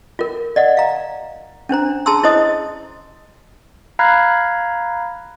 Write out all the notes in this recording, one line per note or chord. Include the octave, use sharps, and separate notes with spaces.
F4 A#4
D5 D#5 F#5
F5 A#5
C#4 D4 C5 A#5
G#4 A5 A#5 C6 E6
E4 C5 C#5 D#5 D#6
F5 A#5 B5 F6 F#6 G#6